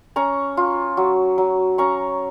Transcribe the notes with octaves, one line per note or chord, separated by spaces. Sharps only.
C#4 A#5 C#6
F4
F#3
F#3
C#4 A#5 C#6